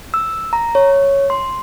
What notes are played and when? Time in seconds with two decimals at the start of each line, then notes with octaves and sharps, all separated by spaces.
0.14 E6
0.53 A#5
0.75 C#5
1.30 C6